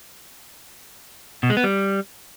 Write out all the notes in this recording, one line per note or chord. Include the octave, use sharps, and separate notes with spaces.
B2
G#3
B3
G3